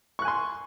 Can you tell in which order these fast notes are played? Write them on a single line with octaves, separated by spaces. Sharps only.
C#6 F#6 G#5 C6